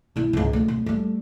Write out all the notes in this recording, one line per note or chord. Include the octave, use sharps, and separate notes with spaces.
G2 E4
C#2 G#2
D2 G#2
D1
G3 A3